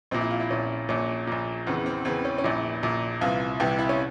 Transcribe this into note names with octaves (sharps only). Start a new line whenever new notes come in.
A#1 A#2 C4
E4
F4
E4
A#1 A#2 C#4
A#1 A#2 C#4
A#1 A#2
E2 C#3 E3 C4
C4
E2 C#3 E3 C4
C#4
C#4
A#1 A#2 E4
A#1 A#2
C2 C3 E3 F4
C2 C3 E3 G4
E4
C#4